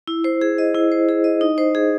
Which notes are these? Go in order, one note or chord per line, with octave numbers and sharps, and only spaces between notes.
E4
C5
G#4
D#5
E4
C5
G#4
D#5
D#4
C5
G#4